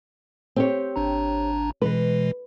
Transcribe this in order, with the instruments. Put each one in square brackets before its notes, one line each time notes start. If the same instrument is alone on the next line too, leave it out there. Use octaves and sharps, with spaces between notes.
[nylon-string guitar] C4 G4 C#5
[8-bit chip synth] G#1 D4 A#5
[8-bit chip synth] B2 E3 G#3 [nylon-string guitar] B4